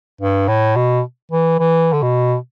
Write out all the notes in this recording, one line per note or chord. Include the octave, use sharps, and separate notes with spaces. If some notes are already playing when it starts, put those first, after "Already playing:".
G2
A2
B2
E3
E3
D3
B2